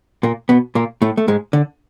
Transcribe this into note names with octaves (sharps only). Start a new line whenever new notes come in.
A#2 A#3
B2 B3
A#2 A#3
A2 A3
A3
G#2 G#3
D3